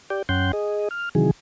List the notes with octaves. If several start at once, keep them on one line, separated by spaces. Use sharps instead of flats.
G4 D5 G5
F#2 C#4 F#5 G5 C6 G6
G#4 D#5
F6
C3 D#3 E3 F#3 G#4